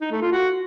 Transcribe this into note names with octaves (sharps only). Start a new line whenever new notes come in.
D#4
A3
F4
F#4